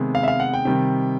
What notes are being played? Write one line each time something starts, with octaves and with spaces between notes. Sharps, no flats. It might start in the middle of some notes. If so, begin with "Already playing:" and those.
Already playing: C3 D#3 G#3 B3
F5
E5
F5
F#5
G5
C3 D#3 G3